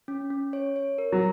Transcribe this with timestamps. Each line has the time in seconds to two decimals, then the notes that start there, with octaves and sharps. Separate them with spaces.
0.08 C#4
0.30 C#4
0.53 C#5
0.76 C#5
0.98 A#4
1.12 F#3